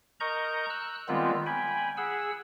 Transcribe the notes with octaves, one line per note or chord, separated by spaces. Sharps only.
A#4 D#5 A#5 C#6 G6
E6 F#6
D#3 G3 G#3 B3 C4 F4
G5 G#5 B5
G#4 F#5 E6